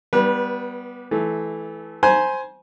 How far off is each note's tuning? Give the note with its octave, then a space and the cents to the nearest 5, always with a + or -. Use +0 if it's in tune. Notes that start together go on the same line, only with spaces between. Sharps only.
G3 +0 B3 +0 B4 -30
E3 -5 A3 -25
C5 +0 G#5 +10 B5 -40